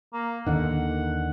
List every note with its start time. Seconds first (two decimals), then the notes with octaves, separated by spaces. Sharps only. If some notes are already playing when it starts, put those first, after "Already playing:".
0.14 A#3
0.47 D#2 D3 D#3 F#5